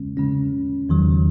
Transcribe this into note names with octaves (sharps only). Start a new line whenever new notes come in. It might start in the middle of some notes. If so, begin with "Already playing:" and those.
Already playing: C#3 G#3 C#4
C#3 G#3 C#4
E2 D#3 F#3